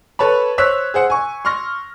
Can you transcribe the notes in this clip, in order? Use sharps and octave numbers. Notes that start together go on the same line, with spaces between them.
A4 B4 C#5 A5 B5
C5 C#5 E6 F#6 B6
G#4 C5 F#5
G#5 C#6
C6 C#6 F6 A#6